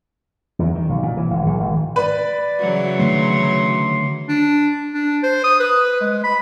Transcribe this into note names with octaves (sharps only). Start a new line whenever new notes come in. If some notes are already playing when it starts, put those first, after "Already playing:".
E2
D#3
B1
A#2
E3
G#1
A#1
G#1
B4 D5
C#3 E3 F#3
D3 D#3 A3 C6
D4
D4
C5
D#6
B4
G#3
B5